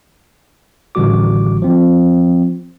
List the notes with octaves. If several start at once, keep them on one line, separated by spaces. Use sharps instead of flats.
A1 D3 G3 F#4 D6
F3 C4